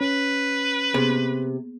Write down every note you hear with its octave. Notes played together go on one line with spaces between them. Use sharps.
C#4 B4
C3 A#3 B3 G#4